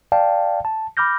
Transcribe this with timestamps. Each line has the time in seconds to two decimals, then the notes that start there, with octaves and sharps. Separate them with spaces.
0.12 D5 F5 G5 A5
0.65 A5
0.97 B5 D6 F6 G6 A#6